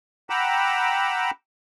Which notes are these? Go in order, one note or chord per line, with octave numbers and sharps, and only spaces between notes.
F#5 G5 A#5 B5 D6 E6